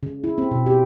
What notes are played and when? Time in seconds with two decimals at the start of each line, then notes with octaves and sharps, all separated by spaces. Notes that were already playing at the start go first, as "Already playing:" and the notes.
0.03 C#3
0.24 E4
0.38 C4
0.51 B2
0.66 G4